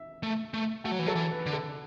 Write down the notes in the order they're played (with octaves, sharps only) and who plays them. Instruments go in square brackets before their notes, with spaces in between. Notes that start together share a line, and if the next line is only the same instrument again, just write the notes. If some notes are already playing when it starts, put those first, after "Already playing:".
Already playing: [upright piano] E5
[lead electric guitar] A3
A3
[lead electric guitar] A3 [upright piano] F#4
[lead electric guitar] F#3
E3
[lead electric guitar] F#3 [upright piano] A4
[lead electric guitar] E3
[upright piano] B4
[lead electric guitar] D3
[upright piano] A4